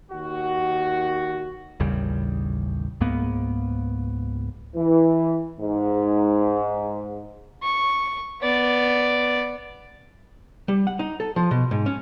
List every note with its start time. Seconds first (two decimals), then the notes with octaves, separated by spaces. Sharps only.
0.11 D#2 D#3 F#4
1.80 A1 D#2 C#3 G3
3.01 C#2 G#2 A#3 B3
4.75 E3
5.59 G#2
7.63 C#6
8.41 B3 D5
10.68 G3
10.87 F#5
10.99 D#4
11.20 A4
11.36 F3
11.51 B2
11.71 G#2
11.86 C#4